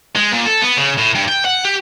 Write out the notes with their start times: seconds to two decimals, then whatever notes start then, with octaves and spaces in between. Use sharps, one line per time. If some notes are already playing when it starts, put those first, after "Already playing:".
0.16 G#3
0.32 A#2
0.45 A4
0.61 B3
0.77 C#3
0.98 A2
1.15 G2
1.28 G5
1.45 F#5
1.65 G4